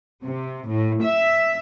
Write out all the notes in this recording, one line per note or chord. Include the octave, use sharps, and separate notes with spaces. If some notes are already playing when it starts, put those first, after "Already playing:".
C3
A2
E5